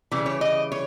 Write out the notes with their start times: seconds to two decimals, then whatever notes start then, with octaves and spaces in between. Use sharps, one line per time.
0.12 C#3 E3 G3
0.26 C#5
0.41 D#5
0.72 C#5